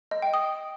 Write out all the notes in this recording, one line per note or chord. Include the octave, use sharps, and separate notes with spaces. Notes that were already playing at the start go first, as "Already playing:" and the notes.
D#5
G5
D#6